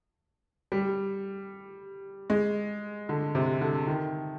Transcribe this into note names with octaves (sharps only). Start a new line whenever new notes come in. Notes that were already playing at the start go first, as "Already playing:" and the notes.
G3
G#3
D3
C3
D3
D#3